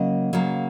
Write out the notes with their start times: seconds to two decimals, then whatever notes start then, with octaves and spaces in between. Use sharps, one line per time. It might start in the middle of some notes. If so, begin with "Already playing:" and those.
Already playing: C#3 F#3 A#3 D#5
0.33 C#3 F#3 A#3